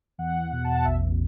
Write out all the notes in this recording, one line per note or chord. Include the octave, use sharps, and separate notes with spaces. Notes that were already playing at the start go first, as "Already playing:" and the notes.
E2 F#5
B2 F#5
A5
F#5
A1 E5